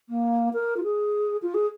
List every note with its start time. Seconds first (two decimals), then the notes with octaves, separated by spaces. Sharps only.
0.09 A#3
0.53 A#4
0.76 F4
0.83 G#4
1.42 F4
1.54 G#4